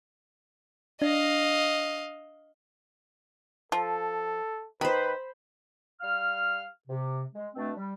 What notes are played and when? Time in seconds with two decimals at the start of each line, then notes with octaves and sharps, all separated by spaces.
1.02 D4 D#5 F5 A#6
3.72 F3 A4
4.81 D#3 B4 C5 B5
6.01 G3 F5 F6
6.88 C3
7.34 G#3
7.55 B2 A3 C4 D4
7.76 G3